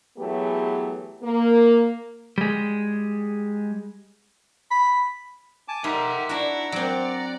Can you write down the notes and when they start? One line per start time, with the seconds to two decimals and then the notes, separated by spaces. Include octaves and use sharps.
0.18 E3 F#3 A3 B3 G4 G#4
1.22 A#3
2.38 G3 G#3
4.71 B5
5.68 G#5 A5 D6
5.84 D#4 G4 A#4 E5 F#5 C6
6.29 D4 E4 F#4 F#5 A#5
6.72 F#3 C4 D5